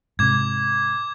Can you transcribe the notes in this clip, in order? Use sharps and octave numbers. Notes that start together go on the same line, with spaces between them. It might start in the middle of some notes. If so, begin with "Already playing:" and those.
G#2 C3 D6 G#6